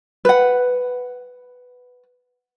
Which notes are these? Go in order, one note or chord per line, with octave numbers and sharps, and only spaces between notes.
B4 F#5